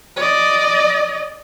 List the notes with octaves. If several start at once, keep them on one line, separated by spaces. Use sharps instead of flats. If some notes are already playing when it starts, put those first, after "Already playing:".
D5 D#5